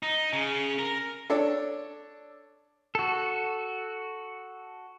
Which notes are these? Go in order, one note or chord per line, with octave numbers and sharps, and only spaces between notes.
D#4
C#3
A#4
D4 A4 C#5
F#4 A4